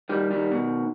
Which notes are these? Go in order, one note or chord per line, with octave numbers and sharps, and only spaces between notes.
D#3 G3
D#3 G3
B2 D#3